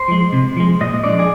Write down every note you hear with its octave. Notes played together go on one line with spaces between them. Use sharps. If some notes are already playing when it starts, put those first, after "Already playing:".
Already playing: C5
F3 G#3
C3
F3 G#3
A#2 D#5
F3 G#3 D4 D5
G#4